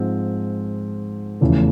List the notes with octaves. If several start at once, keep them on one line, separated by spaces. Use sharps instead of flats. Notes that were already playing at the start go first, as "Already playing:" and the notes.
Already playing: G#2 F3 G#3 C4
F1 E2 C#3 E3 A3